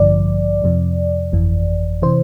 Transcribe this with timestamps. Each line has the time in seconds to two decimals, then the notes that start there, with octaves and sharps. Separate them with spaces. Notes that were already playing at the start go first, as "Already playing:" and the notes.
Already playing: A1 G2 D3 F3 D5
0.62 F2 C3 F3
1.32 G1 F2 E3
2.02 C3 E3 C5